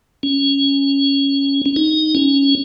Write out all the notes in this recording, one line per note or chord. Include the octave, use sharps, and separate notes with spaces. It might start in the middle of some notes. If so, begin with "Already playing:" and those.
C#4
C#4
D#4
C#4